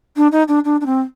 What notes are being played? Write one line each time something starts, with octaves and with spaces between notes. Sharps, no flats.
D4
D#4
D4
D4
D4
C4